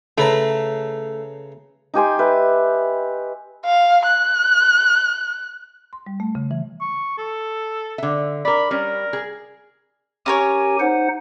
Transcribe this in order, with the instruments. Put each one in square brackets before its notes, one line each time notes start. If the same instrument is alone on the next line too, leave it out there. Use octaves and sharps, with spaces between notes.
[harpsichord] C#3 B4 A#5 [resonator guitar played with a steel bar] A3
[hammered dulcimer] D#4 G4 G#5 C6
B4 E5
[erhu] F5
F#6
[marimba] C6
G3
A3
C#3
E3
[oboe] C#6
A4
[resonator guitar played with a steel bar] D3 E5
[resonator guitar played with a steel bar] A#4 D5 [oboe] B5
[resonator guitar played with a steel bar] G3 C#4 [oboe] A#4
[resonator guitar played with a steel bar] G#4
[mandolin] C#4 A#4 C#5 [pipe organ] G4 G#5
[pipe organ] D#4 C5 F#5